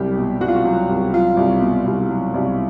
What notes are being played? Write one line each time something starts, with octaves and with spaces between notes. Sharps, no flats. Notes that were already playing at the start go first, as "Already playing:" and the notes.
Already playing: C2 F#3 G4
B2
C2 F#4
F4
F#4
F#3
C2
F#3 F4
C2
B2
C2
F#3
C2